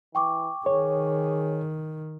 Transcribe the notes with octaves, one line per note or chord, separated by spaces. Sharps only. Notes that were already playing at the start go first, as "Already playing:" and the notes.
E3 G5 C#6 D6
D#3 G#4 C#5